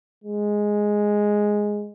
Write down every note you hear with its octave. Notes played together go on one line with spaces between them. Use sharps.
G#3